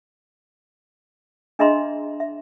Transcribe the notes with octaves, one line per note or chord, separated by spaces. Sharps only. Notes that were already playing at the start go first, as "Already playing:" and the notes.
D4 G#4 D#5 E5 A#5 C6
E5